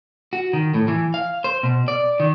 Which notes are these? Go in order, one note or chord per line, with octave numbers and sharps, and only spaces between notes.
F#4
D#3
A2
E3
F5
C5
B2
D5
D#3